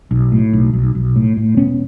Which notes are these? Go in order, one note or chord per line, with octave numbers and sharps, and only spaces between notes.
B1
A2
B1
B1
B1
A2
A2
E1 B3 C#4